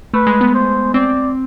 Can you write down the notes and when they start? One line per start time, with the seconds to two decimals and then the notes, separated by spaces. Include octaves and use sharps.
0.14 A3 B4
0.27 G#3
0.41 B3
0.54 C5
0.94 C4 D5